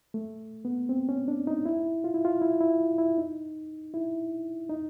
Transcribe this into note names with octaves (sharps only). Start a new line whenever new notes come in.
A3
B3
C4
C#4
D4
D#4
E4
F4
E4
F4
E4
E4
E4
D#4
E4
D#4